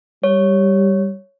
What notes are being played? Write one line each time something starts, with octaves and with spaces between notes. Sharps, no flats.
G3 C#5